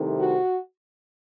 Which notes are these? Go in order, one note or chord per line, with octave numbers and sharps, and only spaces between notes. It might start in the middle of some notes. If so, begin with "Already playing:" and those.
Already playing: C2 C3 D#3 A3
F#4